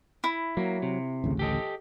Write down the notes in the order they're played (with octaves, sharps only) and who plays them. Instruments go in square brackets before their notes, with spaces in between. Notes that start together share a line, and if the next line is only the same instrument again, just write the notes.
[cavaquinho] E4
[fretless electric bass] F#3 [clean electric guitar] A#3
[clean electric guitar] C3
[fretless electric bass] A1 D2 C#3
[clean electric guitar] G4 A4 D#5